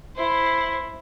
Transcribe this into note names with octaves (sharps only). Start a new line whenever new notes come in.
E4 C5